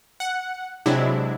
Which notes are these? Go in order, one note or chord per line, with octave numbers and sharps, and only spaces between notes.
F#5
C3 F#3 G#3 D4 E4